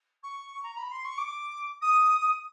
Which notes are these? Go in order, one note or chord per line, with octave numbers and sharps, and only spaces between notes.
C#6
A#5
B5
C6
C#6
D6
D#6